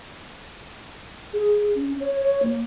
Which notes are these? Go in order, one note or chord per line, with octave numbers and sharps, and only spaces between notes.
G#4
C#4
C#5
C#5
A#3